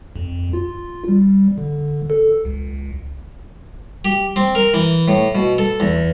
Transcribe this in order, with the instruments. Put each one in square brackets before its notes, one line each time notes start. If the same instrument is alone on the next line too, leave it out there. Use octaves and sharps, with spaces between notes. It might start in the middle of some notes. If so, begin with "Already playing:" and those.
[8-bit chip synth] F2
F4
G3
D3
A4
C#2
[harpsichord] G4
C4
A#4
E3
A2
B2
A4
E2